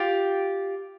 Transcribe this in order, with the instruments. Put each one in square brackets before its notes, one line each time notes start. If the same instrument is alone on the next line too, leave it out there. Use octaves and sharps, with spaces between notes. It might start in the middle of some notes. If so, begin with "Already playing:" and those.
Already playing: [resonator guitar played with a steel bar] F4 G4